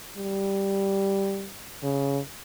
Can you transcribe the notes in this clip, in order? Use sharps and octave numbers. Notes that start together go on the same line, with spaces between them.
G3
C#3